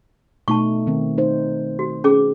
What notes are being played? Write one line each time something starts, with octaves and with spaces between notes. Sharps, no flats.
B2 A3 D#4 A5 C#6
D#3 C4
D#4 C5
F#4
C#4 G#4 D6